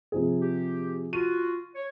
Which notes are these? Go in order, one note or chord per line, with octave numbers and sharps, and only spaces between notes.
C3 F3 G#4
G4
F4 F#4 D#7
C#5